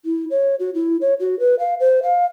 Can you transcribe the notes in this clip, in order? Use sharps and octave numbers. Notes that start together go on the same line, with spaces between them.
E4
C#5
F#4
E4
C#5
F#4
B4
F5
C5
F5